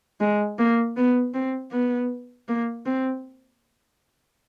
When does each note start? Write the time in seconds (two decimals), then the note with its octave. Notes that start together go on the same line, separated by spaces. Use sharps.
0.20 G#3
0.59 A#3
0.96 B3
1.34 C4
1.72 B3
2.48 A#3
2.86 C4